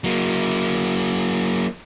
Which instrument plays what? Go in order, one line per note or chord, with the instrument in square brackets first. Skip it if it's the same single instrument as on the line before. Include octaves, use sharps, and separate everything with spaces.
[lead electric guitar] F#3 A#3